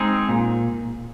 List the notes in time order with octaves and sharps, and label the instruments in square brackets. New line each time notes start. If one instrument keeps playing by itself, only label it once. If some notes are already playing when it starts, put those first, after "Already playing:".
Already playing: [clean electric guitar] G#3 C4 D#4 G#4
A#2